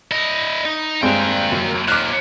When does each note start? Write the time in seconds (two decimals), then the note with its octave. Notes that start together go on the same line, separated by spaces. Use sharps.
0.12 E4 D#5
0.66 D#4
1.02 G2 G#3 A#3 C4 G5
1.52 F#2
1.88 D#2 A#2 D6 F6 F#6